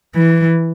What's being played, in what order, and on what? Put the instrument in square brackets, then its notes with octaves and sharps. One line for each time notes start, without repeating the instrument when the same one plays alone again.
[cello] E3